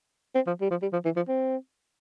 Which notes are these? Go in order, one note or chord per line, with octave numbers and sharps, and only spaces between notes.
C4
F3
G3
F3
G3
F3
E3
F3
C4